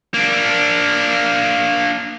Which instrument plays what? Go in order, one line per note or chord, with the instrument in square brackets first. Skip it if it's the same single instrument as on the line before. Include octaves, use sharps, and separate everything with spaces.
[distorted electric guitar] A#3 D4